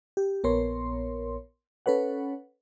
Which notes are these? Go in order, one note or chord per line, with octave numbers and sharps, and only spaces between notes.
G4
A#1 B3 A#4 C#5 C6
C#4 A4 B4 C#5 F#5